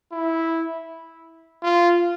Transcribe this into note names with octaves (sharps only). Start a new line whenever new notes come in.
E4
F4